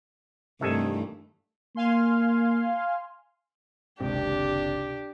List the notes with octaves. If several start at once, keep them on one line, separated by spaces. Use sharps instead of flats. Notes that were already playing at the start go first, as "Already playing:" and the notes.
G2 C3 D#3 E3 A3 A4 G#5
A#3 F5 G#5 C6
F#1 C#2 C3 D#3 C4 D4 G4